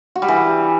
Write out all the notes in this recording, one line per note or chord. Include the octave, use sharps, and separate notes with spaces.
F#4
G3
E3